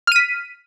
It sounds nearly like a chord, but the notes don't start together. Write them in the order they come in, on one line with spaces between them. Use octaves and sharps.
F6 D#7 B6